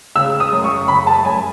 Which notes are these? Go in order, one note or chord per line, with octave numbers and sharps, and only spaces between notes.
C#3 E6
D#6
F#2
C#6
C#3 B5
A5
F#2 G#5